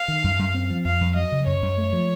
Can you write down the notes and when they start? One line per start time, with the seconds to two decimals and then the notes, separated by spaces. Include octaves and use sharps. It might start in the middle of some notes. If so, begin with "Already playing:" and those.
Already playing: F5
0.08 D#3
0.24 F#2
0.39 F#2
0.54 C4
0.70 F3
0.85 F2 F5
1.01 F2
1.15 F#3 D#5
1.32 C#3
1.46 F#2 C#5
1.62 F#2
1.78 A3
1.93 F3